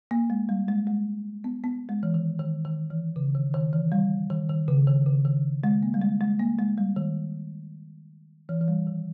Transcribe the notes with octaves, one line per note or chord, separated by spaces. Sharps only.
A#3
G#3
G3
G#3
G#3
B3
B3
G#3
E3
D#3
D#3
D#3
E3
C#3
D#3
D#3
E3
G3
D#3
D#3
C#3
D#3
C#3
D#3
G#3
A#3
G3
G#3
G#3
A#3
G#3
G3
D#3
E3
E3
G3
D#3